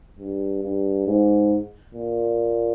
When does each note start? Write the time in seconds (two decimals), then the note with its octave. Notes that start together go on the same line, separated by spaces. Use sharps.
0.19 G2
0.63 G2
1.07 G#2
1.95 A#2